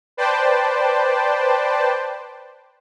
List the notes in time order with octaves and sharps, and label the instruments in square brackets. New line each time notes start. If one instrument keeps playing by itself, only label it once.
[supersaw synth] B4 C5 D5 G5 A5